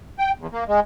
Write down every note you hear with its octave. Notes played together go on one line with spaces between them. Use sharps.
G5
E2
A#3
G#3